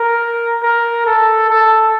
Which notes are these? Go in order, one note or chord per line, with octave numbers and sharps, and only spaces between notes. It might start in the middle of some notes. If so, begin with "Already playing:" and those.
Already playing: A#4
A#4
A4
A4